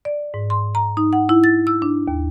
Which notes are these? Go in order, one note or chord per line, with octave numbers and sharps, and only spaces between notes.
D5
G#2
C6
A#5
D#4
F#5
E4
A6
E6
D4
D#2